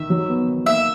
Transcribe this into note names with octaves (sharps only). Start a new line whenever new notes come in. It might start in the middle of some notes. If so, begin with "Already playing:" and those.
Already playing: D#3 E5
F#3
B3
D#3
A#3 E5